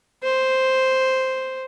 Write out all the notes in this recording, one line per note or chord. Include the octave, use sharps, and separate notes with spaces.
C5